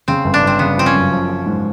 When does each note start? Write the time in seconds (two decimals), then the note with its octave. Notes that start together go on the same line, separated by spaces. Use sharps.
0.08 C#3 C4
0.24 G1
0.34 D4
0.43 G1 C4
0.59 C#3 B3
0.77 F3 C4
0.86 C#4
0.95 F#2
1.12 F3
1.29 F3
1.46 G#2